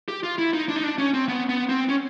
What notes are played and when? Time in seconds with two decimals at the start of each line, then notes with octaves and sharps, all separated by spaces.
0.08 G4
0.23 F4
0.38 E4
0.53 D#4
0.68 D4
0.76 D#4
0.83 D4
0.98 C#4
1.14 C4
1.28 B3
1.49 B3
1.69 C4
1.89 C#4